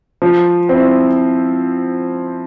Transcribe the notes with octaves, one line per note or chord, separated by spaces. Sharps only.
F3
C4 E4